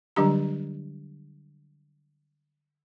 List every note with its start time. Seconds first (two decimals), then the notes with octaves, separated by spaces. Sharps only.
0.16 D3 F#3 G3 D4 G4 A#5